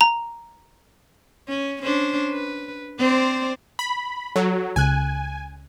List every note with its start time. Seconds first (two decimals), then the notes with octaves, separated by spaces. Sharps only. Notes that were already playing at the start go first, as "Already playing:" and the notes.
0.01 A#5
1.48 C#4
1.83 C#4 D4 C5
2.32 B4
2.99 C4 C5 D5
3.79 B5
4.36 F#3 A4
4.76 C#2 C#3 G#5 F#6